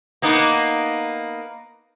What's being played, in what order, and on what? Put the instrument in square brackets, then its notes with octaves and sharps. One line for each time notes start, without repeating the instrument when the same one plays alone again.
[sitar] A#3 B3 D#4